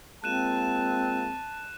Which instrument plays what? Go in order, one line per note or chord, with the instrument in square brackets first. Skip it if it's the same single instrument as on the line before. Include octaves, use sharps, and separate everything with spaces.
[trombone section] G#3 A#3 F4 [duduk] C4 [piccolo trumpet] A5 [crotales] F#6 D#7 E7